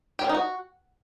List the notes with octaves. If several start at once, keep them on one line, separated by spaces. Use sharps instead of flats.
G4
C#4
D#4
F#4